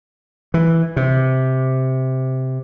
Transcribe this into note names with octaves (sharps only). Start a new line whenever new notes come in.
E3
C3